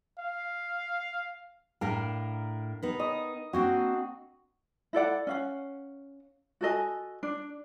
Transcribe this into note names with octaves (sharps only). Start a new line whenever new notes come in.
F5
A2 D4 A#4 F5
B3 D#4 B4
D#5
A#3 C4 D4 F#4
E4 A4 D5 F#5
C#4 F5 F#5
F#4 A4 D#5 G#5
D4